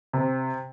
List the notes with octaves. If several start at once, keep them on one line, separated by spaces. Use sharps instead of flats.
C3